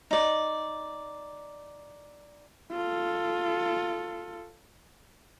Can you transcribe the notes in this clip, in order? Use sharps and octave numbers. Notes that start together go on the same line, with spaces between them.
D#4 D5
F4 A4